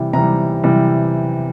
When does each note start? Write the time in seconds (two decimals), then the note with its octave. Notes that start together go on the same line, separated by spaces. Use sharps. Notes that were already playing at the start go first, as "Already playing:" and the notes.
Already playing: C3 E3 G3
0.13 C3 E3 G3 A#5
0.63 C3 E3 G3